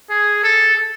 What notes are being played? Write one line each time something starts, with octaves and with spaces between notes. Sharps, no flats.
G#4
A4